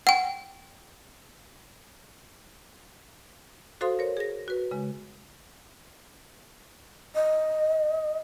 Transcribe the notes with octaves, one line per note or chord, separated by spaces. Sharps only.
F#5 G5
F#4 A4 C5 F5 C6 D#6
A#4 C#5
G#4 A#6
F#4 B4
C#3 G#3
D#5